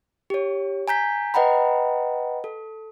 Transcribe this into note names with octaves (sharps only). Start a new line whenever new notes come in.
G4 C#5
G#5 A#5 G6 B6
B4 D#5 F#5 G5 A#5 B5
A4